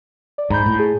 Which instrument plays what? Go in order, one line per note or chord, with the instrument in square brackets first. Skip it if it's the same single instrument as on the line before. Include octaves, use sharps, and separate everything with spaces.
[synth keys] D5
[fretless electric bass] G#2 [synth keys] A#5 B5 G6
[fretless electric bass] A2
[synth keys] G#4